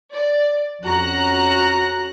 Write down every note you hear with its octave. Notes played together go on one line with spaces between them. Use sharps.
D5
F2 C#4 F#4 A#5 F#6 A#6